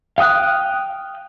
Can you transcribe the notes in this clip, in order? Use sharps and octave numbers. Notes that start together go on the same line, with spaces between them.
F5 G5 D#6 F#6